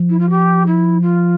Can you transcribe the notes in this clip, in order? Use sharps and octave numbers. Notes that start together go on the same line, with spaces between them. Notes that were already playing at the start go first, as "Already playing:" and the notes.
Already playing: F3
E4
F4
G4
E4
F4